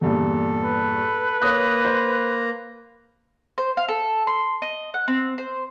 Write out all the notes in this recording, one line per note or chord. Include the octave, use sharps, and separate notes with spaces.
E2 G2 A#2 A4
B4
A#3 C#5 A#5 D#6 F#6
C5
C5
F5
A4
C6
D#5
F#5
C4
C5